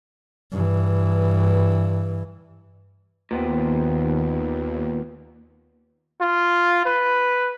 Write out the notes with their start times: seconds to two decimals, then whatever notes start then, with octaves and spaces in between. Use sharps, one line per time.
0.52 G2 E3
3.31 D#2 A#2 B3 C4
6.21 F4
6.85 B4